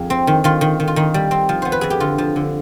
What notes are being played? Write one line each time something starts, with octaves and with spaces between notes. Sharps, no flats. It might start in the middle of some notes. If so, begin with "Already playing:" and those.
Already playing: F2 G#4
C4
D#3
D#3 F4
D#3
D#3
F4
D#3 D#4
G3
C4
F3
B3 C5
B4
F2 G#4
G4
D3 F4
F3
D3